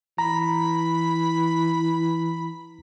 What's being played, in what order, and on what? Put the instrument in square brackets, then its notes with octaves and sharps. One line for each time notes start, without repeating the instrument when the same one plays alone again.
[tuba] E3 [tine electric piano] A#5 [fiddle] B5